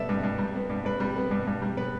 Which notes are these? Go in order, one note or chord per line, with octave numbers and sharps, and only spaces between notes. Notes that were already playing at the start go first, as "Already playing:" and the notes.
Already playing: G3 B3 A4 D5 E5
G2
G2
G3
B3
G2
G2 B4
G3
B3
G2
G2
G3
B3 B4